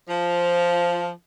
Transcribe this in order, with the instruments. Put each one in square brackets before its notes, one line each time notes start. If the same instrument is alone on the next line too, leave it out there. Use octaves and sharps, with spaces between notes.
[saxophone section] F3